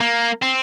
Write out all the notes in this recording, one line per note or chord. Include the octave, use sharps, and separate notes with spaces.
A#3
C4